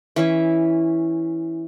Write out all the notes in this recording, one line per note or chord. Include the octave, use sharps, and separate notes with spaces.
E3 C#4 E4